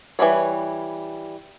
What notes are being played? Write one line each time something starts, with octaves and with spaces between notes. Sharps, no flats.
E3 G3 B4 C#5